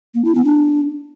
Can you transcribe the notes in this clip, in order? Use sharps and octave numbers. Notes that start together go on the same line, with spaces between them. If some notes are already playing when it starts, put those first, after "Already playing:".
A#3
E4
B3
D4